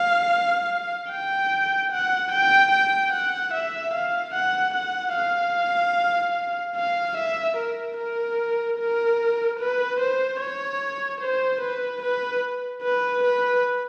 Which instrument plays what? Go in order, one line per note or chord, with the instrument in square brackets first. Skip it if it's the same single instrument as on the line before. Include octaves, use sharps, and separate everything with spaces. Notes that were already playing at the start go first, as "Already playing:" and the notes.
Already playing: [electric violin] F5
G5
F#5
G5
G5
F#5
E5
F5
F#5
F#5
F5
F5
E5
A#4
A#4
A#4
B4
C5
C#5
C5
B4
B4
B4
B4